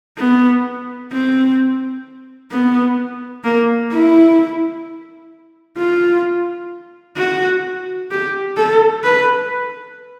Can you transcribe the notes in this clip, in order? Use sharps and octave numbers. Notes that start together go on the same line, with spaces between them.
B3
C4
B3
A#3
E4
F4
F#4
G4
A4
B4